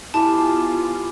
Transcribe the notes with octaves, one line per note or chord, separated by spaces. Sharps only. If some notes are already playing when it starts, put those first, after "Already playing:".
B3 E4 F4 G4 G#5 A5 B5 D6